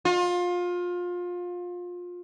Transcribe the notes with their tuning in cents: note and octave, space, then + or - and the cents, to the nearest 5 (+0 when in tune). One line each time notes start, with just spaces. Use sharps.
F4 +25